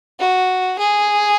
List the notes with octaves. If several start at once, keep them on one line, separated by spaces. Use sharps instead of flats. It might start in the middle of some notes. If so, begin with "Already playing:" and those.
F#4
G#4